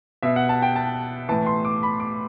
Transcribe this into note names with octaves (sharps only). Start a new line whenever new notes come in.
B2 E5
F#5
A5
G5
A5
A2 E3 A5
C6
D6
B5
D6